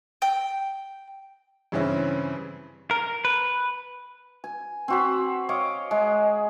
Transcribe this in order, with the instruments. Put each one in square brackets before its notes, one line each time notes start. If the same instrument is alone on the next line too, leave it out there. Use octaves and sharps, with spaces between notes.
[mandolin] G5
[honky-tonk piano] G2 C#3 E3 C4 C#4 E4
[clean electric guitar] A#4
B4
[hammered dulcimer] G#5
C4 F#4 B5
C#5 D#5 F5 D6
G#3